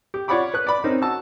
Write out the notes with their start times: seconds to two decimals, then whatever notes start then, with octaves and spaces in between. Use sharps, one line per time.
0.14 G4
0.28 F4 C#5 D5 F#5 B5 D6
0.54 B4 F#6
0.67 D5 B5
0.84 C4 C#4 D#4 A#4
1.02 F#4 A5 E6